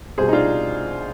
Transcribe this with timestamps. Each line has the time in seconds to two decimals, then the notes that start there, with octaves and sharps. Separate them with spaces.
0.18 C2 B2 G#4 C5
0.28 D#4
0.33 D4 F4